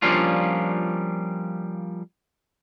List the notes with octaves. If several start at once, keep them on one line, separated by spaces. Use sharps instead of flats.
F3 G3 A#3 C#4 D4 F4